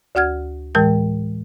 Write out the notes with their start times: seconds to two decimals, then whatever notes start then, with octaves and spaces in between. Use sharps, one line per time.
0.15 D2 F#4 F#5 F6 G#6
0.75 A2 E3 G#3 A#4 G5